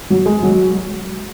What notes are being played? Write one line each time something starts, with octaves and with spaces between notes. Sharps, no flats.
F#3
G#3
F#3